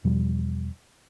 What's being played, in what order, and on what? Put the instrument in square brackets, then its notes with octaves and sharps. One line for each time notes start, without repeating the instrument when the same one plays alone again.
[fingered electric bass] E2 B2 F3 G3